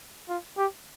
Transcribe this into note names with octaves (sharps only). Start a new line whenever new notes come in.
F4
G4